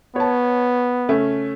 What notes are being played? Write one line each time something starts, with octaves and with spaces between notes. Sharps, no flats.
B3 C#5 A5
C#3 A3 C#4